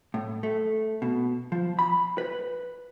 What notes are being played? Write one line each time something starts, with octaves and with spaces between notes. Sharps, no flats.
A2
A3
B2
F3
B5
B4